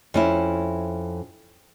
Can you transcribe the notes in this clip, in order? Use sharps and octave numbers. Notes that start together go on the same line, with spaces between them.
F2 C#4 E4